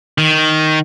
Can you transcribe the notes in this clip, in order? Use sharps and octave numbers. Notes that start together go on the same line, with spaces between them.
D#3